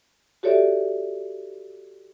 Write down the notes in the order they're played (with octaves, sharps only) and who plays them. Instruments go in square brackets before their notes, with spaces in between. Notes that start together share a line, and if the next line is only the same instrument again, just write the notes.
[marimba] F#4 G4 A4 C#5 D5 E5